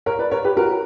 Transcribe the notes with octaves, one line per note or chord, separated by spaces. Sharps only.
A#4 C#5
B4 D5
A#4 C#5
G4 B4
F#4 A#4